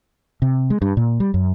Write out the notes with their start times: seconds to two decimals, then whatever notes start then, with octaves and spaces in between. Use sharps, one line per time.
0.42 C3
0.70 G#3
0.82 G2
0.97 A#2
1.20 G3
1.34 F#2